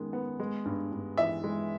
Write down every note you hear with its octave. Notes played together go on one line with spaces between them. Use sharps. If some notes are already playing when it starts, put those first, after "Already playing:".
Already playing: F#2 D#3 G#3 B3
B3
G#3
G2
G2
E3 E5
G#3